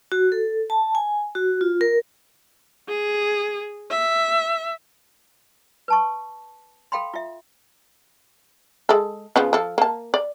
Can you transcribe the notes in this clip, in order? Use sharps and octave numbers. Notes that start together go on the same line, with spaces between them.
F#4
A4
A5
G#5
F#4
F4
A#4
G#4
E5
B4 A5 C#6
A4 F5 G5 B5 C6
F4 E5
G#3 A4
C#3 F3 B3
F3 A4
A#3 A5
D5